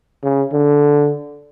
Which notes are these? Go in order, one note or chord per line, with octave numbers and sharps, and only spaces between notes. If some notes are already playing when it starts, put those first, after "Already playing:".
C#3
D3